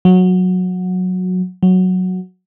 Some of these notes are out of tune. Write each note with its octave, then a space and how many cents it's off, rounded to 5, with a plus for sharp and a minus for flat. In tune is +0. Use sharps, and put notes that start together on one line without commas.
F#3 -15
F#3 -5